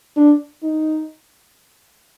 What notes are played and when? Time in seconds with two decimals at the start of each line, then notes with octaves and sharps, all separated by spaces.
0.17 D4
0.63 D#4